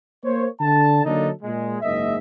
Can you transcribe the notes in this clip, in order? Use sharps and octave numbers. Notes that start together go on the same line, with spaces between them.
A#3 C5 C#5
D3 A5
D3 F#3 A#3 D4 D#4 A4
A#2 G#3
F#1 G#2 A#3 D#5 E5